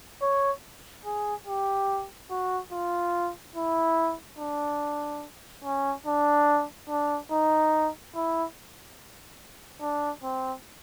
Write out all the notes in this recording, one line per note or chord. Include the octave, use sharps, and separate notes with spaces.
C#5
G#4
G4
F#4
F4
E4
D4
C#4
D4
D4
D#4
E4
D4
C4